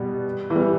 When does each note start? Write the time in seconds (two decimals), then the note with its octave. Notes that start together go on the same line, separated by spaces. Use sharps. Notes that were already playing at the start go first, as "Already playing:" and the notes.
Already playing: B2 G3 B3
0.50 E3
0.56 G3